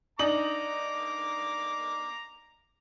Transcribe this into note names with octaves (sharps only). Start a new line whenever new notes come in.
D4 D#4 A#5 D6 F#7